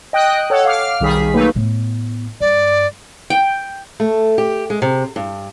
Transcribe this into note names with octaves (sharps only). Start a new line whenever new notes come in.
D#5 G5 D#6 F#6
A4 C#5 F#5
F5 D6 F6
B1 D#3 G3 G#4 B6
F#3 A3 A#3 D#4 B4
A2 B3
G2 D5
G5
A3
G4
G#3
C3
G2